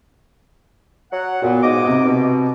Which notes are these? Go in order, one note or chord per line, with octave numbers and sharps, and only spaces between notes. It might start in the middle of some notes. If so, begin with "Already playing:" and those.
F#3 F#5
A#2 B3 F#4
G#2 D#5 D6
C3
B2